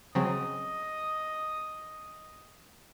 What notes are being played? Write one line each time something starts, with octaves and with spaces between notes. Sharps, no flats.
C#3 F#3 C4 D#5